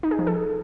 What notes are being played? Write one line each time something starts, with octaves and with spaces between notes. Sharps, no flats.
D#4
G#4
F3
A4